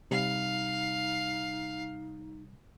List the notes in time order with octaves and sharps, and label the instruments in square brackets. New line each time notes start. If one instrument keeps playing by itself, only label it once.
[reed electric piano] C3 G3 [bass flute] D#4 [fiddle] F5